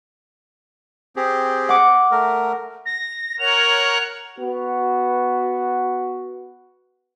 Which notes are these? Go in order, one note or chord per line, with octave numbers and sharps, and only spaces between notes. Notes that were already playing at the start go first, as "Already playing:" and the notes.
C4 G4 G#4
F#5 D6
A3 A#4
A#6
A#4 C#5 F#5 F7
B3 F#4